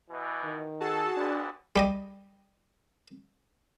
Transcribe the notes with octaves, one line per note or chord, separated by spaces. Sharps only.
B2 E3
D#3
F#4 G#4 A4 A5
D#2 A#2 B3 D4
G3 G4 D#5